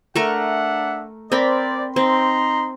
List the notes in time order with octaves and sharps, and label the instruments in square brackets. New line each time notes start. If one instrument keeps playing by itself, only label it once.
[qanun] A3 A#4 C#6 [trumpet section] D4 E5 F#5
[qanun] C4 A#4 B5 [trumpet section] C5 D5
[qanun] C4 [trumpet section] D#4 A#5 C6